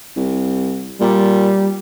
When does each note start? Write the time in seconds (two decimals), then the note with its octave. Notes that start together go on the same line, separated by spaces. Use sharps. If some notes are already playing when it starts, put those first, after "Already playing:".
0.16 C2
1.01 A#2 G3